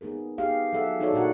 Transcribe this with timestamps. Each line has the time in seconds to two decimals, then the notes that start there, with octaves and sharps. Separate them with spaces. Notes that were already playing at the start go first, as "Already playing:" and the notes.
0.01 B3 D#4 G#4 A#4
0.38 B3 D#4 G4 G#4 F5
0.73 F#3 A4 E5 F#5
1.00 D#4 F#4 G#4 A4 C#5 D5
1.13 A#2 D4 F#4 A#4 F#5